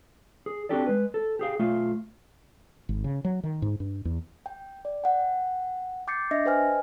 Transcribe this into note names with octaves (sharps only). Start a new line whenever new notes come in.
G#4
C4 D4 F#4 G4 A4 D5
G#3 B4
A4
G4 G#4 F5
B1 A3 F4 F5
G#1
C#3
F#3
D#3
G#2
G2
E2
G5
D5
F#5 G5
G5 D6 G6 A6 C7 C#7
D4 D#5 E5 A#6
B4 C5 D#5 G5 G#5 F6